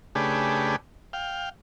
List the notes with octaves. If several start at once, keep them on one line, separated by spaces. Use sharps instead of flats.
C#3 A3 D4 G4 G#4 B4
F5 G5